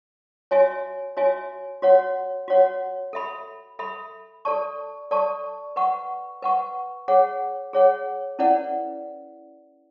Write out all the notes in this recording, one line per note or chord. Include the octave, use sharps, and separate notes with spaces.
F#4 C#5 E5 G#5
F#4 C#5 E5 G#5
F#4 C#5 F#5
F#4 C#5 F#5
A4 E5 B5
A4 E5 B5
A4 D5 A5 C#6
A4 D5 A5 C#6
B4 F#5 C#6
B4 F#5 C#6
G#4 C#5 F#5
G#4 C#5 F#5
C#4 E4 B4 D5 F#5